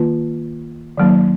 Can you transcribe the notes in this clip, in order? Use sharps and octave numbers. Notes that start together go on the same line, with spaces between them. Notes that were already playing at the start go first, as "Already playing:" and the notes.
Already playing: D#3 A#3 F4 B4
D#3 F#3 A#3 D#4